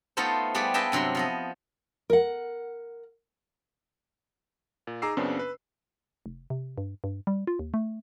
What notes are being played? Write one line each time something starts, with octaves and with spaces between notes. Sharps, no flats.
A3 B3 D#4 F4 A4 C5
G3 B3 G#4 B4 D5
G#4 B4 D#5 E5 G5 A5
G2 C3 F#3 C5 C6
F3 B3 D#5
A#4 F#5
A#2
D#4 G#4 A#5 D6 E6 C7
F#2 C#3 B3 C4 D4
B4
F1
C3
G2
G2
G3
F4
D#2
A3